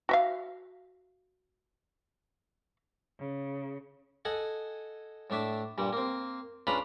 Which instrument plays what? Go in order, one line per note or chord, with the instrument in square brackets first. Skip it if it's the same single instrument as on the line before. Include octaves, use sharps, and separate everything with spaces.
[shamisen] F#4 E5 F5
[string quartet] C#3
[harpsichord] A4 D#5 F#5 G#5
A2 A3 D4 E5 A5
G2 A#2 G3
A#3 C4
C#3 D4 F4 B4 A#5 B5